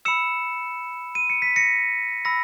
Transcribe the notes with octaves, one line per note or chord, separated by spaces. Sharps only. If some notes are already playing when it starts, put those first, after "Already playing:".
B5 E6 C#7 E7
D#7
C#7
B6
A#6 C#7
B5 E6 A#6